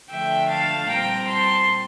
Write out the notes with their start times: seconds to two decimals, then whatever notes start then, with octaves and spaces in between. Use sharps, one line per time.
0.10 D3 F3 A3 D4 E5 G5
0.49 F5 A5
0.90 A#2 G3 C4 G5 A#5
1.29 A5 C6